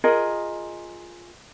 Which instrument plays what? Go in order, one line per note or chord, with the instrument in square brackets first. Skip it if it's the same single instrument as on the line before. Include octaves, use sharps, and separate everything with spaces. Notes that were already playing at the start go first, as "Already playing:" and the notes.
[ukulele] F4 G#4 A#4 D#5